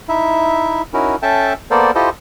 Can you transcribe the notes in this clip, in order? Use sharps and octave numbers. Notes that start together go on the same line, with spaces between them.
D#4 E4 E5
C#4 D#4 E4 F#4 A#4
C#4 A4 E5 G5 A5
A#3 B3 A4 A#4 C5 D5
E4 F4 G4 A4 C5 D#5